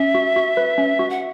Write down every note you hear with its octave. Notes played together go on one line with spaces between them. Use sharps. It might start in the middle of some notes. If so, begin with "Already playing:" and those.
Already playing: C#4 E5
F#4
F#4
B4
C#4
F#4
F#5